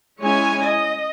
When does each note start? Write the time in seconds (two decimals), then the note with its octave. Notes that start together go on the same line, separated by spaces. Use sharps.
0.21 G#3 C#4 E4 C#5 G#5
0.64 D#5